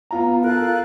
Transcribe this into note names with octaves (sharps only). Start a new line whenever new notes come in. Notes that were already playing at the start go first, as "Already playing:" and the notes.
B3 F4 A#5
F4 A4 A#4 F5 F#6